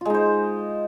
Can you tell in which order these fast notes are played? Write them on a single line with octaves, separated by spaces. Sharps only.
F4 G#3 D#4 C5